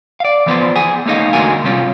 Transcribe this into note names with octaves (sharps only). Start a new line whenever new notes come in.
D5 F5
E3 F3 B3 B4 C5 D5
G#4 F#5 G#5
A3 A#3 C#4 D#4 D#5 F5
E2 D3 G#3 F#4 A#4 G#5
C3 G3 C4 C#4 F4